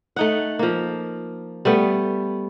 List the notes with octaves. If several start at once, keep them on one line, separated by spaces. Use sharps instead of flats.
A3 D#4 F#5
F3 A#3
G3 A3 B3